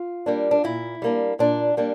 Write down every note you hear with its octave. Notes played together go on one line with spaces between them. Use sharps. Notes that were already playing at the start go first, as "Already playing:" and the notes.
Already playing: F4
G3 A#3 D4
D4
A#2 E4
G3 A#3 D4
A#2 D4
G3 A#3 D4